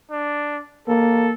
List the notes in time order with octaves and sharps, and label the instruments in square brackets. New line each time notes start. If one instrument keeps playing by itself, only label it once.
[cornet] D4
[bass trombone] A#3 [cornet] A4